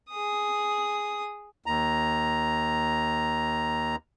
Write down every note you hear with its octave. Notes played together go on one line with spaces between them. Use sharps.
G#4 D#6
D#2 A#5